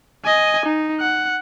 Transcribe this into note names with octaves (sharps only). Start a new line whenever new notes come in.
D#5 G#5
D#4
F#5